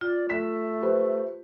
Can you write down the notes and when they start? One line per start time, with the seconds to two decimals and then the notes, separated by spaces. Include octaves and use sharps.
0.01 F4 D5
0.29 A3 B6 E7
0.82 G4 B4 C5